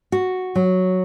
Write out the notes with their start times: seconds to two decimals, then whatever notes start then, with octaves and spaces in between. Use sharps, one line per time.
0.12 F#4
0.56 F#3